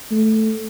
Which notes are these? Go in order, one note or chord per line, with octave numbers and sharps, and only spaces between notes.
A3